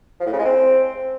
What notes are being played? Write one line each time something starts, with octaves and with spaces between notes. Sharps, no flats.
F3
A2
C#3
G#3
C4